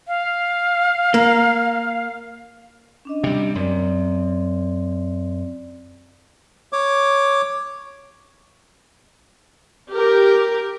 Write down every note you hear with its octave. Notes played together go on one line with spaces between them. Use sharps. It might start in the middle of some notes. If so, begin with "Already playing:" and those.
F5
A#3
C#4 D4 D#5
C3 G3
F#2 C4 D5
C#5 D6
G4 A#4